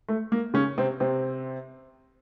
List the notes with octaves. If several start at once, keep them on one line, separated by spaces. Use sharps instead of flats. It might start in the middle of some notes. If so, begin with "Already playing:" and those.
A3
A#3
C#3 C#4
C3 C4
C3 C4